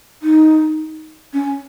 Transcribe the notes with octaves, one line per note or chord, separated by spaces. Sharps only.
D#4
C#4